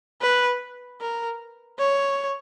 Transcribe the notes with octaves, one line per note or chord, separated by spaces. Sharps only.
B4
A#4
C#5